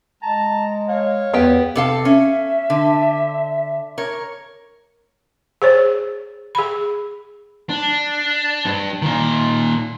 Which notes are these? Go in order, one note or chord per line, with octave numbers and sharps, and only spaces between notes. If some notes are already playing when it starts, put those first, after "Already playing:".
G#3 A5 A#5
C#5 F5
E2 B3 G4 G5
C3 A4 F5
C#4 E5
D3
A#4 C#5
G#4 C5 C#5
G#4 B5
D4
G2
A#2 D#3